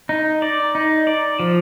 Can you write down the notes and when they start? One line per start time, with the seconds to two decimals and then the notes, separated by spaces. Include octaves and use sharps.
0.09 D#4
0.42 D5
0.75 D#4
1.07 D5
1.39 F3